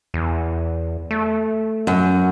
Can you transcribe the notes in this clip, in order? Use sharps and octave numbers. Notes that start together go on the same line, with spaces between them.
E2
A3
F#2